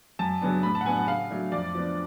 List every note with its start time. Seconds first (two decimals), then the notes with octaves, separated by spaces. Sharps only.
0.19 F#2 A5
0.41 C#3 F#3 B3 D4
0.63 A2 B5
0.75 A5
0.81 F#5
0.85 F#3 B3 D4 G#5
0.97 F#5
1.07 C#3 F5
1.30 F#3 A3 D4
1.52 F2 D5
1.74 F3 B3 D4